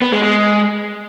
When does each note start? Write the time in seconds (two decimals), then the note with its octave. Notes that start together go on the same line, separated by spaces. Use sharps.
0.02 B3
0.12 G#3
0.23 G#3